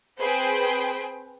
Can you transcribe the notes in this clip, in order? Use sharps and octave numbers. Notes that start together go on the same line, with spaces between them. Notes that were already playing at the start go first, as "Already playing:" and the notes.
C4 G#4 B4 C5 G5 B5